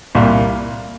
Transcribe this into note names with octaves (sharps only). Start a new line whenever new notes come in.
C2 A#2 G3 A#3